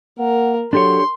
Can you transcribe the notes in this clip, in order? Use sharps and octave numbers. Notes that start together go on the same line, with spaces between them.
A#3 A#4 F#5
F#3 D4 G4 A4 C#5 C6